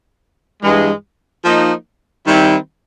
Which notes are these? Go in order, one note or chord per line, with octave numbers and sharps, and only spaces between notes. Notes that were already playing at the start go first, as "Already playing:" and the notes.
G2 E3 G#3
F3 A#3 D#4
D#3 G3 C4 E4